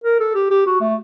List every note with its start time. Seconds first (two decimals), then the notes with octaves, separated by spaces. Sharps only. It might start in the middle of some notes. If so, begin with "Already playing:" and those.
0.04 A#4
0.20 A4
0.35 G4
0.50 G4
0.66 F#4
0.81 A3